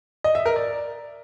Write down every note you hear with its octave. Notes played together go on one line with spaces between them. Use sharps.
D#5
E5
A#4
D5